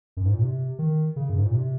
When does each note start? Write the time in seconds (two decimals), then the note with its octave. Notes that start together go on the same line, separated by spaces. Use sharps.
0.17 F#2
0.25 G#2
0.34 A#2
0.42 C3
0.79 D#3
1.16 C#3
1.29 F#2
1.38 G#2
1.46 A#2
1.54 C3